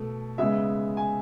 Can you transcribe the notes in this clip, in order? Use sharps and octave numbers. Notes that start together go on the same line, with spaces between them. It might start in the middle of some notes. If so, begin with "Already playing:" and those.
Already playing: B2 A3
C#3 G#3 B3 E5
G#5